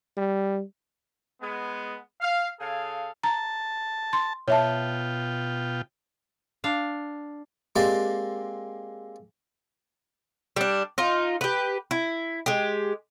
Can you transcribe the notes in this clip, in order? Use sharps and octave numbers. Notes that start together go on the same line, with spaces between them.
G3
G#3 B3
F5
C#3 G#4 A4 F5
A5 A#5
C6
B2 F4 C#5 E5 G5 A5
D4 F5
G#3 A#3 C4 G4 D5
G3 D4
D#4 F4
G4 B4
E4
G#3 G4